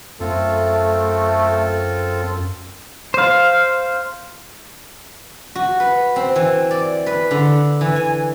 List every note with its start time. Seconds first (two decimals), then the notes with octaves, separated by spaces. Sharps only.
0.20 F#2 A3 C4 F4 A4
3.14 C5 F5
5.55 F#4
5.80 B4
6.16 C4
6.36 E3
6.71 D5
7.06 B4
7.31 D3
7.81 E3
7.96 G#5